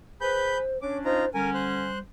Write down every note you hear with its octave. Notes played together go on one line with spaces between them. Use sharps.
G#4 B4 C5 B5 G6
C#4 D4 C#5 D6
D#4 F4 C5 A#5
D3 G3 C#4 A#4 G#5
C5 F#6